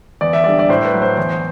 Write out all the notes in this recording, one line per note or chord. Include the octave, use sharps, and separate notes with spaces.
E2 D5
E5
D3 G3 D5
D5
A2 C5
B4
F#3
C5
E2 C5